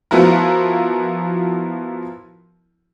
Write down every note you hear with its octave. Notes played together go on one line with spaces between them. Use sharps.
F3 B3 E4 F#4 A#4